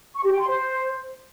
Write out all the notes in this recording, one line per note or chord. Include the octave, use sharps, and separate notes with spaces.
C#6
G4
G5
C6
C5